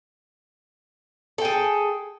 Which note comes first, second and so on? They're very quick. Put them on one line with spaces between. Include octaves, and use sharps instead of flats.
A4 G5 G#4